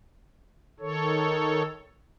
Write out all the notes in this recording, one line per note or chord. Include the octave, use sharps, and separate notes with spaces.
D#3 A4 C#5